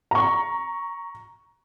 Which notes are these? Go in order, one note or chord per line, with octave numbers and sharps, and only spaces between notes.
A#5 C#6